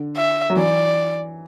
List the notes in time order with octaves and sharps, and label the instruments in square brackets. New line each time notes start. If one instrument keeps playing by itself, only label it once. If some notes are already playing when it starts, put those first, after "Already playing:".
Already playing: [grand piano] D3
[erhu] E5
[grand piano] F#3
[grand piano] E3 [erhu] D5